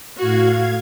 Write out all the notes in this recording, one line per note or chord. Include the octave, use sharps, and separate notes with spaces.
A2 F#4 F5 G#6